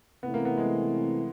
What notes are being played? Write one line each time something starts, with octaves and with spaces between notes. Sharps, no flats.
C3 E3 A3 B3 C4 E4
A#3
B3
G#3